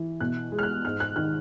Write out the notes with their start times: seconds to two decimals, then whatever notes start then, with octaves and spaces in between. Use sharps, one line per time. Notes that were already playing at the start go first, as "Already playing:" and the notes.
Already playing: E3
0.20 B2 F#6
0.52 G#3
0.59 F6
0.63 F#6
0.84 G#2 F6
1.00 F#6
1.16 D#3 F#6